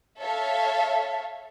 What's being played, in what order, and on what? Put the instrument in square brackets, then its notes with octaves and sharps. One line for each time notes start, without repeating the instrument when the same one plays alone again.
[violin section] A4 C#5 E5 F5